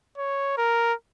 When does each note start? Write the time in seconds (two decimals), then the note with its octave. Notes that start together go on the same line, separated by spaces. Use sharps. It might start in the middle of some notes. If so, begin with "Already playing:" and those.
0.18 C#5
0.57 A#4